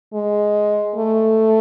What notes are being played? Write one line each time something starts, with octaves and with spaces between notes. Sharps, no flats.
G#3
A3